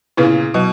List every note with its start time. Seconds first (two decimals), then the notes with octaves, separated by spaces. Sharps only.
0.17 A#2 C#3 B3 E4 B4
0.54 B2 F#3